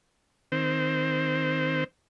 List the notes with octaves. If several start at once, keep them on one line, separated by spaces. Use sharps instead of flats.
D#3 C4 C5